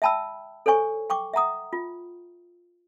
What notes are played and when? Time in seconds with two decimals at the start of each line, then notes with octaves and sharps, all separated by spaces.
0.02 E5 G5 A5 B5 E6
0.66 A4 C5 C#5 G#5 C#6
1.10 G5 C#6 D6
1.34 E5 F#5 A#5 D#6
1.73 F4